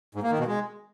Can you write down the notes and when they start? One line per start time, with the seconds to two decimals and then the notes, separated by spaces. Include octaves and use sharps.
0.15 G#2
0.23 A#3
0.31 D#3
0.39 B2
0.47 G#3